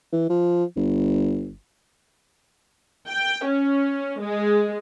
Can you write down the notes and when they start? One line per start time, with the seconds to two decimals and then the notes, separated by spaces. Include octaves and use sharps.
0.13 E3
0.30 F3
0.77 G1
3.09 G5
3.47 C#4
4.21 G#3